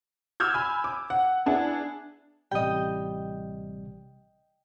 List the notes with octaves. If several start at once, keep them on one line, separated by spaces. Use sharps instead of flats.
D6 E6 F6 G6 G#6
G#5 B5
D6
F#5
B3 D4 E4 G#4
A1 C3 G3 D#5 G5